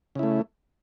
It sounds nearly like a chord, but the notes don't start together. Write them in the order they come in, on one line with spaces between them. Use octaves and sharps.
C#3 E4 A3